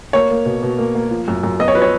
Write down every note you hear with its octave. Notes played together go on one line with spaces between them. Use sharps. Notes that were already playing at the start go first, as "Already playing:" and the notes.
A#3 C#5
A#3
B2
B2
A#3
A#3
F3
F#2
F#2
B3 D#5
C#5
F3 B4
C#5